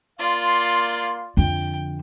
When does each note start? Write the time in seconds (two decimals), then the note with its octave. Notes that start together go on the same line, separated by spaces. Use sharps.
0.19 A#3 F4 D5 F5 C6
1.37 F2 D3 G5